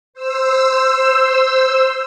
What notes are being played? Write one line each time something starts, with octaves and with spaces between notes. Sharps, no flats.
C5 E6